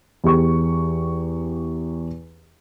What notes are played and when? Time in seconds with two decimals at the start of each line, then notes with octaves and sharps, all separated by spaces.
0.24 E2 G4 C#6